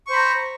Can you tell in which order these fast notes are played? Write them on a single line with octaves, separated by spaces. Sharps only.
C#6 C5 B5 A#5